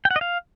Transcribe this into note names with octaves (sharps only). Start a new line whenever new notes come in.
G5
F#5
D#5
F5